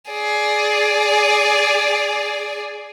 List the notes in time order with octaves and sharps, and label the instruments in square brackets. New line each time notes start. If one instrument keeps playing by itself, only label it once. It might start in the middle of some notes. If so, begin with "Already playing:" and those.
[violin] G#4 D5